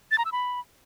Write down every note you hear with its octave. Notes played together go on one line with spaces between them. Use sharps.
A6
A#5
E6
B5